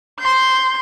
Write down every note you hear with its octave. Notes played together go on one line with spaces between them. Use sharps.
C6 G6